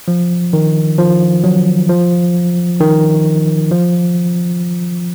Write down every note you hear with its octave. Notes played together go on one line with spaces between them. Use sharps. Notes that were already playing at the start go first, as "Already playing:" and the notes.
F3
D#3
F3
F#3
F3
D#3
F3